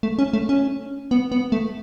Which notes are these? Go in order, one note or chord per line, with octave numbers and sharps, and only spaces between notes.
A3
C#4
A3
C#4
B3
B3
A3